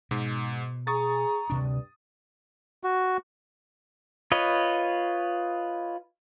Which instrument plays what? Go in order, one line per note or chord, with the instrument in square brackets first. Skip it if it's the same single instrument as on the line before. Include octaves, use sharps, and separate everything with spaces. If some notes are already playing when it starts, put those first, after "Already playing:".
[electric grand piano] G#2 [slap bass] B2
[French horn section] G#4 [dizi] A#5 [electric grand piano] C#6 D#6 A6
[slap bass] D2 C3 D4 [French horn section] G2
[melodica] F#4
[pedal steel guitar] F4 B4 C#5 D#5